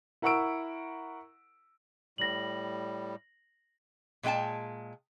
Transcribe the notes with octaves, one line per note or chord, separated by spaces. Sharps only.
E4 A#4 F#5 C#6 E6 D7
A2 G3 A#6 F#7
A#2 G#3 D#4 G5 A5